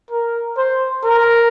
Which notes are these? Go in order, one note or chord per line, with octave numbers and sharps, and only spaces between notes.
A#4
C5
A#4